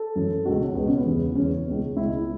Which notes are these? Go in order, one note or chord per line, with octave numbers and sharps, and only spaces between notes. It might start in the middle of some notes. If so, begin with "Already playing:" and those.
Already playing: A4
F#2 E3
C#2 B2 F#4
C#4
C#2 B2 B3
C#4
B3
E2 C#3 E3
E2 C#3 E3 C#4
C#2 B2
C#2 B2 E4